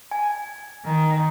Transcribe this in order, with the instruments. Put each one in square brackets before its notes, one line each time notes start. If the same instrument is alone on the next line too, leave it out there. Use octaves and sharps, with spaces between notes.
[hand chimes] G#5
[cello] D#3